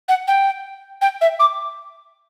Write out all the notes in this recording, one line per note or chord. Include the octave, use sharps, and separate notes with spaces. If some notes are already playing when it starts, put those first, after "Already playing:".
F#5
G5
G5
E5
D6